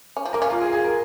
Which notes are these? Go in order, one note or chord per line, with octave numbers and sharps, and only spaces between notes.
C#4
F3
A#3 A#4
C#4
F4
G#4
G#4
A#4